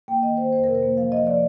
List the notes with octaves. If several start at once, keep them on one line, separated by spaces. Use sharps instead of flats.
A#3 G5
D#3 D#5
D#3 C5
F2 C5
C3 A#4
C5
A#3
F3 F5
F3 D#5
D5